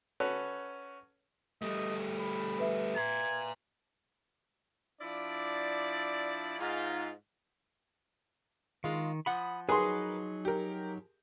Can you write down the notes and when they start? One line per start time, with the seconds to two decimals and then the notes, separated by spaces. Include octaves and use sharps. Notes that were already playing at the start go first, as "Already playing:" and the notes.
0.20 C#4 F#4 A4 B4 C#5
1.62 G3 A3 D#5
2.19 B5
2.59 B4 E5
2.96 A#5 C6 G#6
5.01 F3 D4 E4 D5
6.58 G#2 F4
8.84 D#3 G#3 F4
9.26 F3 F#5 B5 D#6
9.69 F#3 D#4 G#4 A#4 B4 C6
10.45 G4 A#4